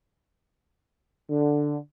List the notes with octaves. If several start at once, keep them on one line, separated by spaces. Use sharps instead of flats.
D3